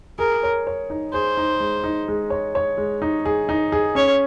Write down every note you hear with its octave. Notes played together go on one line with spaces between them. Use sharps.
G#4 A#4
C#5
C#5
D#4
G#4 C5
D#4
G#3
D#4
G#3
C#5
C#5
G#3
D#4
G#4
D#4
G#4
C#4 C#5